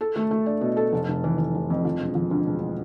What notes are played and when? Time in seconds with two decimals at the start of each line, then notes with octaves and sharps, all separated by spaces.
0.01 A4
0.16 A3
0.31 A3
0.46 D4
0.61 B2
0.77 A4
0.92 F1
1.08 F1
1.24 E3
1.38 E3
1.55 F1
1.70 F2
1.85 F3
2.00 E1
2.15 F3
2.31 D2
2.47 E1